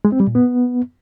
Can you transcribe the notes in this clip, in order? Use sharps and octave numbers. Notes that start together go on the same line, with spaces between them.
G#3
C4
G3
A#2
B3